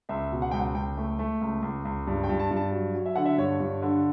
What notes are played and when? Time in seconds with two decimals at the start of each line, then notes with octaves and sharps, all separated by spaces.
0.09 C#2 E5
0.32 B2
0.42 F#5
0.51 C#2 G5
0.60 F#5
0.75 C#2 G5
0.97 A3
1.19 A3
1.41 C#2
1.62 C#2
1.85 C#2
2.07 G2
2.24 G5
2.29 G2
2.39 A5
2.51 G2
2.56 A5
2.72 F#3
2.94 F#3
3.06 E5
3.16 D3 F#5
3.25 E5
3.38 G2 C#5
3.60 G2
3.82 D3